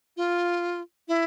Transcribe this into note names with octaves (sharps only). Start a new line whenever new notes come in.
F4
E4